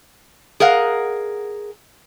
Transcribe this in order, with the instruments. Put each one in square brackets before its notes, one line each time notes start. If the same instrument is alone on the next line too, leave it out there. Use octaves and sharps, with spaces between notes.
[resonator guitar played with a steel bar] G#4 A#4 D#5 F5 F#5